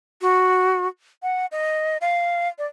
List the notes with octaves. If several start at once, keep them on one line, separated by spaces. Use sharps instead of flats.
F#4
F#5
D#5
F5
D5